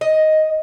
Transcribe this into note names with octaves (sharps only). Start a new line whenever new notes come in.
D#5